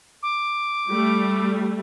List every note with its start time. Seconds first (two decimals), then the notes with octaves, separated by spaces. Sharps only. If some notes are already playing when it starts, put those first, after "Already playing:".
0.23 D6
0.90 G3 A3